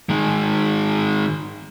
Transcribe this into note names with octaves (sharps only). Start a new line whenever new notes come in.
D#3 G#3